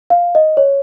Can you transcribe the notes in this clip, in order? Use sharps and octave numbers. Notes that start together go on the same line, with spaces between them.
F5
D#5
C#5